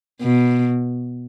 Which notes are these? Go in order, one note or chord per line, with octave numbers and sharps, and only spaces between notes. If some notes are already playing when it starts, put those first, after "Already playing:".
B2